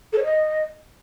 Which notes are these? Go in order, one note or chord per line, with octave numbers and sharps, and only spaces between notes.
A4
C#5
D#5